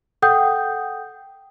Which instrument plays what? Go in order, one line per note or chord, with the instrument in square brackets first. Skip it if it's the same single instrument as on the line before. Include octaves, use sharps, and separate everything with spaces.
[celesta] A4 F#5 G5 D#6 G6